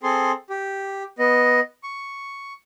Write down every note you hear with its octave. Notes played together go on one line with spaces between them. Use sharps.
C4 G#4 A4 C6
G4
B3 D#5
C#6